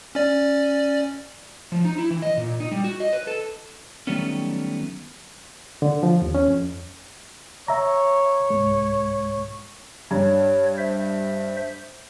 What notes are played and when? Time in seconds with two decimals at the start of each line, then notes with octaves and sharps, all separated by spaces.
0.15 C#4 D5
1.72 F3
1.85 D#4
1.98 E4
2.10 E3
2.22 D#5
2.37 A#2
2.60 D#4
2.72 G3
2.84 F#4
3.00 D#5
3.13 B4
3.27 A4
4.07 D#3 F#3 G3 A3 B3 C#4
5.82 D3
6.03 F3
6.22 D#2
6.34 C#4
6.48 F2
7.68 C#5 E5 A#5
8.50 C2 G#2 G#3
10.11 G2 C#5
10.78 C5 E5